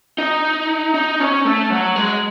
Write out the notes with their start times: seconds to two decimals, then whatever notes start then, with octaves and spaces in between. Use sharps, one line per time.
0.18 D#4
0.95 D#4
1.20 C#4
1.45 A3
1.70 F#3
1.96 G#3